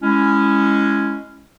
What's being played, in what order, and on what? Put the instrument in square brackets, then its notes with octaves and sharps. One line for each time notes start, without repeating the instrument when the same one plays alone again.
[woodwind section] G#3 C#4 E4